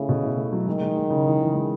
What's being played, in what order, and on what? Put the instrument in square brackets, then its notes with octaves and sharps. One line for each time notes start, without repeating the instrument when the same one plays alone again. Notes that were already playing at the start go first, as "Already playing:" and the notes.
Already playing: [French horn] C#3 [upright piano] A3 E4
[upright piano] B2
E4
A3
F#3
[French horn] D#3 [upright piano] G#3
[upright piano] G#3
G#3
C#3
E3
E3
G#3